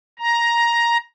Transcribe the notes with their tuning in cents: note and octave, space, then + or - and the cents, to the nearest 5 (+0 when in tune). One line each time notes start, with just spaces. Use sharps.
A#5 +10